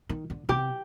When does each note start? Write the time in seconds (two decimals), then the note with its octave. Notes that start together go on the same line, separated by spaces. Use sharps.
0.09 D#3
0.30 D3
0.49 C3 G4